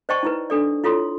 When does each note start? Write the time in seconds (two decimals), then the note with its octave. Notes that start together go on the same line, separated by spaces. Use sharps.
0.09 C5 D5 D#5 G5 A5 C#6
0.23 D#4 E4 B4
0.50 D4 A4 D5
0.84 E4 F4 A4 C#5 C6